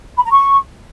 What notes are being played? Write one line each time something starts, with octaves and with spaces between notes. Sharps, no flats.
B5
A#5
C#6